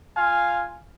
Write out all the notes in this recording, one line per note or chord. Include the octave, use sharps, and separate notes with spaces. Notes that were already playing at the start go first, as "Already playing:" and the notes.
F4 F5 G#5